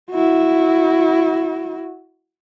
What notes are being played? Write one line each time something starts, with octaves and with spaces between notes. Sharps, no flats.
E4 F#4